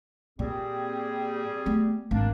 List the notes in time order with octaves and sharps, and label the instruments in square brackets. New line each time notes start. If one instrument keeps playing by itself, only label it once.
[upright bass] A#2 [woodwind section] G3 C4 G#4
[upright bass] A3 B3
[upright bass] G#1 [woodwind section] A#3 D4